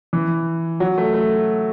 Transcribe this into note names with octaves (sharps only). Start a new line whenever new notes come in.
E3
F#3
A3
A3